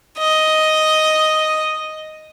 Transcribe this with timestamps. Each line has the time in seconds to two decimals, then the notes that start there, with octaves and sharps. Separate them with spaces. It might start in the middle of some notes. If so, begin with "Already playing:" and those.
0.18 D#5